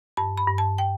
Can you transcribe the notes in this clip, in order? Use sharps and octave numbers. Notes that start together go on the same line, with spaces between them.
G2 A5
B5
G2
A5
G5